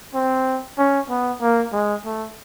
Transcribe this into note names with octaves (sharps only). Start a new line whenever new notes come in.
C4
C#4
B3
A#3
G#3
A3